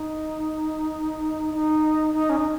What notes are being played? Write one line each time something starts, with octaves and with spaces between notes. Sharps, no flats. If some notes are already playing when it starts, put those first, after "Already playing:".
Already playing: D#4
D#4
D#4
C#4
D#4